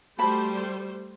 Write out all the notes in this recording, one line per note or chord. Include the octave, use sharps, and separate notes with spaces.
G3 A3 F#4 C5 A5 B5